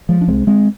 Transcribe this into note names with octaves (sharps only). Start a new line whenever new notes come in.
F3 G#3
D4
C2 C3 G#3 C4
G#3 C4